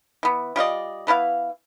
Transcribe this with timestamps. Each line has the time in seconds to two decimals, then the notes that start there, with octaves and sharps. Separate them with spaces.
0.23 E3 B3
0.56 G3 F4 D5 D#5
1.07 E3 B3 E4 F5